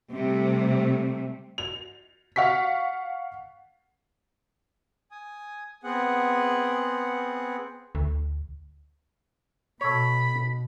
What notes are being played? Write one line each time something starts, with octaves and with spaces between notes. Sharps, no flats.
C3 G3 A3
F7
F5 F#5 C#6 B6
G#5 D#6
B3 C4 G#4 F#5
D2
B2 A4 C#5 B5